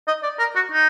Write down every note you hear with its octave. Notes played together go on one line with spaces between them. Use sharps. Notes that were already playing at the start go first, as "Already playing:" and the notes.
D#5
D5
A#4
F#4
D#4